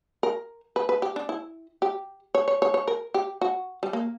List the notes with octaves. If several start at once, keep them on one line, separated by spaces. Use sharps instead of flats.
A#4
B4
B4
G4
D4
E4
G4
C#5
C#5
C#5
C#5
A#4
G4
F#4
G3
A#3